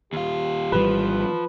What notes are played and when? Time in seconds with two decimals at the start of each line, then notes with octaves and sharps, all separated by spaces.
0.13 D#2 F4 G4
0.72 G#1 E3 F3 G3 B4